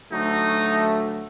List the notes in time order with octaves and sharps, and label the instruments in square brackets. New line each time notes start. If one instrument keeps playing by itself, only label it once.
[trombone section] D2 F#3 A3 [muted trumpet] D#4